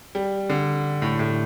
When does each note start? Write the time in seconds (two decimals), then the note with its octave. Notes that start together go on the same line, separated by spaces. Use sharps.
0.15 G3
0.50 D3
1.02 A2
1.19 A2